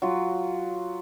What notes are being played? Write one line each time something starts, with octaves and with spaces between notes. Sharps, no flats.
F#3 F4